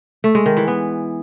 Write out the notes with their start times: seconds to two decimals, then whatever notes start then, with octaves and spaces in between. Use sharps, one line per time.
0.24 A3
0.35 G#3
0.46 D#3
0.57 E3
0.68 B3